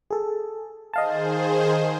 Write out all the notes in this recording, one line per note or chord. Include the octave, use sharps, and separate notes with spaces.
G#4 A4
D#3 G#4 C5 D#5 F5 A5